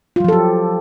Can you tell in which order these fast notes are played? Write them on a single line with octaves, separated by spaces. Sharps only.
F4 F#3 F3 A4 G4